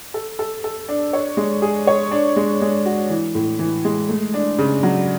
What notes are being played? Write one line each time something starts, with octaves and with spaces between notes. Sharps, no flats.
A4
A4
A4
D4
C#5
G#3
G#4
C#5
D4
G#3
G#3
F#4
E3
A2
E3
G#3
A3
D4
C#3
F#3